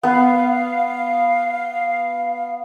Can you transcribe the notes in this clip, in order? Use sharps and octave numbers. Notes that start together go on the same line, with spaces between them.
B3 B4 F5